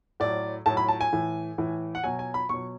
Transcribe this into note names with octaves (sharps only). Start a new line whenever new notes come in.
A2 F#3 D5
A2 F#3 A5
B5
A5
G#5
A2 E3
A2 E3
F#5
B2 F#3 G#5
G#5
B5
B2 F#3 C#6